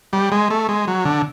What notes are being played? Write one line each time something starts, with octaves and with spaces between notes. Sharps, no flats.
G3
G#3
A3
G#3
F#3
D3